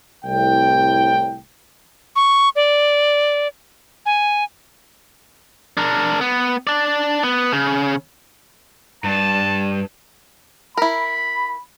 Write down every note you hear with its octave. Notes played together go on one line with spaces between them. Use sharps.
C2 A2 G5
C#6
D5
G#5
D4 A#4
B3
D4 D5
B3
C#3
G2 A5
E4 A#4 B5